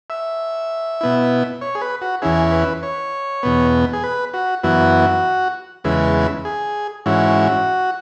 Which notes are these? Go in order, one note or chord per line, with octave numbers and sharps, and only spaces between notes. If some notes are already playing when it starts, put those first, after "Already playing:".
E5
B2 B3 E4
C#5
G#4
B4
F#4
E2 E3 C#4 E4 G#4
B4
C#5
E2 B2 B3
G#4
B4
F#4
F#2 E3 B3 E4 F#4
E2 C#3 G#3 E4 B4
G#4
G#2 E3 C#4 E4 F#4